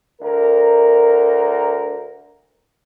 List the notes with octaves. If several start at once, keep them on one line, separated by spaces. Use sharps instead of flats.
D2 A#4